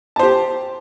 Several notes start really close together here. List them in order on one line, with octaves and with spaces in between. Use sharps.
A5 C5 G4